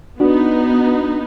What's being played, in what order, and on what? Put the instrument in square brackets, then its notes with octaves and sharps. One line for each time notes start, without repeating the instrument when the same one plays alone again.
[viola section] B3 D#4 [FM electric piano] D4 F#4